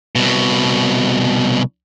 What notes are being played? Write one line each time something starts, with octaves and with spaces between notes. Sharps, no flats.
C2 B2